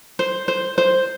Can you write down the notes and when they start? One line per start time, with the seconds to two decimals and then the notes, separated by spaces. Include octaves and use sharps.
0.19 C5
0.48 C5
0.78 C5